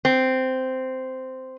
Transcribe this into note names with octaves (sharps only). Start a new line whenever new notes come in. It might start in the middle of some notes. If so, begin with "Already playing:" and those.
C4